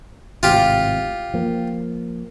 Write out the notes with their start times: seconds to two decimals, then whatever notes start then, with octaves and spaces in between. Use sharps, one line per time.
0.43 G#1 A2 C3 F4 G4
1.34 F3 A#3